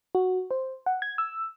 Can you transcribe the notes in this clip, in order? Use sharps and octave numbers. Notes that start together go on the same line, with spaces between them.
F#4
C5
F#5
G#6
E6